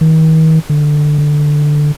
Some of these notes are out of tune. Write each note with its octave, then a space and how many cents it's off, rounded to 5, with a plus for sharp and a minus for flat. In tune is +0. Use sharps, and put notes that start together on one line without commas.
D#3 +40
D3 +15
D3 +10